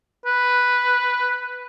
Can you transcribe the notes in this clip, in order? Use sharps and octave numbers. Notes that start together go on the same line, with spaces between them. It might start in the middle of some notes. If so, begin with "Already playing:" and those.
B4